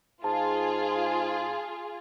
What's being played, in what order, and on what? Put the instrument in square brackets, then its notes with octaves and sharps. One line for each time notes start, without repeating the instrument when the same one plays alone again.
[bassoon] G#2 [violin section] F4 G#4 [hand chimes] A5